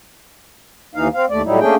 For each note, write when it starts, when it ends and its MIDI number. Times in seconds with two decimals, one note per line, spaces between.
0.95 1.08 39
0.95 1.08 52
0.95 1.08 63
0.95 1.08 77
1.14 1.25 60
1.14 1.25 77
1.30 1.42 39
1.30 1.42 57
1.30 1.42 74
1.45 1.60 45
1.45 1.60 54
1.45 1.60 55
1.45 1.60 63
1.45 1.60 64
1.60 1.75 57
1.60 1.75 58
1.60 1.75 61
1.60 1.75 62
1.60 1.75 68
1.60 1.75 79